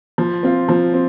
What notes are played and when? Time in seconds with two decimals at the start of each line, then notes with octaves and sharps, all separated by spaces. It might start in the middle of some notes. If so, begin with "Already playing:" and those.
0.18 F3
0.43 C4 F4
0.68 F3
0.93 C4